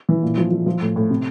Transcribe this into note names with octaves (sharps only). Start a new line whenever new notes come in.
E3
A#2
F3
F3
F3
A2
A2
C3